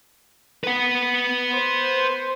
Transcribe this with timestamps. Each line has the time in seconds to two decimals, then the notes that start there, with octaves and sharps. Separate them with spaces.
0.64 B4 F#5
1.52 C5